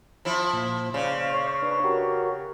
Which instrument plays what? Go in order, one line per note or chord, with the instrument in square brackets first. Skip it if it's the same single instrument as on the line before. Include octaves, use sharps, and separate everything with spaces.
[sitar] F3 E4
[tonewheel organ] A#2
[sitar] C#3 [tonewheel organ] C5 D5 F5
[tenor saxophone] C#5
[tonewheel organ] D4 B4
F#4 G4 A#4